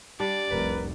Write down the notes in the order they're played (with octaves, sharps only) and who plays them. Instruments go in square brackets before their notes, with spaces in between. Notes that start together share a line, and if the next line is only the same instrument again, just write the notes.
[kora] G3 D4 [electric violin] D5
[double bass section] F1 C2 [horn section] A#4 B4